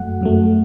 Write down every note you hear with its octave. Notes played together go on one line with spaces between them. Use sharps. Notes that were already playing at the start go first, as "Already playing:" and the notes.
Already playing: F#2 F#3 A3 F#5
F#2 F#3 A3